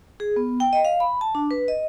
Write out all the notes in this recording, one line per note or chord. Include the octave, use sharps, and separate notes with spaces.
G#4
B3
G5
D#5
F5
B5
A5
D4
B4
D#5